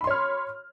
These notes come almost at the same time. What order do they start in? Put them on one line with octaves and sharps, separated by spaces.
B5 C6 C#5 F6